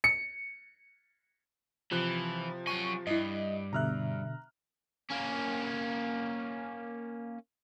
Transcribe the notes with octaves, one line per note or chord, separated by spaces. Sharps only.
C#7
C3 E3 F3 F#6
F#3 G#5 C#6
G2 E4 D#5
B2 D3 E5 A#5 F6 F#6
A#3 C#4